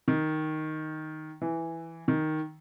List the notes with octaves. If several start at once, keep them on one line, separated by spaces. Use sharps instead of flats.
D#3
E3
D#3